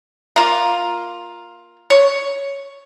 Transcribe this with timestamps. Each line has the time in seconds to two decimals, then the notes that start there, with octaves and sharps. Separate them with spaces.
0.36 A#3 F4
1.90 C#5